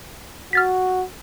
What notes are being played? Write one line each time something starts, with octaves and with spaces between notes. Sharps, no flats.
F#4 F6 A6 B6